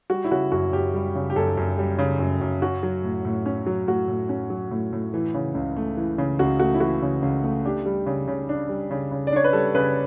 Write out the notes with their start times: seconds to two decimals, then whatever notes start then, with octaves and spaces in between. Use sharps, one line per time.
0.10 G3 F#4
0.24 E4
0.31 C#3 F#4
0.52 F#2 F#4
0.73 F#2 G4
0.94 G3
1.15 C#3
1.30 G4
1.36 F#2 A4
1.57 F#2
1.78 G3
1.99 C#3
2.20 F#2
2.41 F#2
2.62 C#4 F#4
2.83 F#3
3.04 A2
3.25 A2
3.46 C#4
3.67 F#3
3.88 A2 F#4
4.08 A2
4.29 C#4
4.50 F#3
4.71 A2
4.93 A2
5.14 E3
5.34 C#3
5.55 C#2
5.76 A3
5.97 E3
6.18 C#3
6.39 C#2 F#4
6.60 A3 F#4
6.74 E4
6.80 E3 F#4
7.02 C#3
7.22 C#2
7.43 A3
7.65 D4 G4
7.86 G3
8.06 C#3
8.28 C#3
8.49 D4
8.69 G3
8.91 C#3
9.12 C#3
9.27 D5
9.32 D4 C#5
9.44 B4
9.53 G3 A4
9.75 C#3 B4